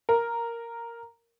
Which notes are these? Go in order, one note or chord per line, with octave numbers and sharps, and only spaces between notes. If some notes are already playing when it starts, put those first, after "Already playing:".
A#4